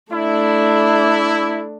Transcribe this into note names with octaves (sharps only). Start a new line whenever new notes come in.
A3 D4 E4